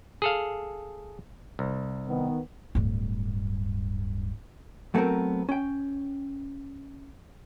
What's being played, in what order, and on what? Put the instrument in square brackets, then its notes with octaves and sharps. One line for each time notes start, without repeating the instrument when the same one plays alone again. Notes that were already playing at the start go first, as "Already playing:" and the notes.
[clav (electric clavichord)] G#4 A4 F5
C2
[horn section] D#3 B3
[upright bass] D1 G2
[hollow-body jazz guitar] F#3 A3 B3 C4 A#4
C#4 G5